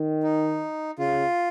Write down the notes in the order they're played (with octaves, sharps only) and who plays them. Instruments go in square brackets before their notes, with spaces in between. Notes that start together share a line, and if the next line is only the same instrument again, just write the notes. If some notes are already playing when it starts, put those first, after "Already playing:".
Already playing: [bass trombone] D#3
[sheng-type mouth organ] D#4
[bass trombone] C#3 [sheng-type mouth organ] F4